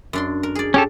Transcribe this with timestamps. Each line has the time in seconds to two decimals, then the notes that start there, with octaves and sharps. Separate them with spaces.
0.13 F#2 D4 C6
0.43 A#4
0.55 G#4 D5
0.74 C#4 G4 A4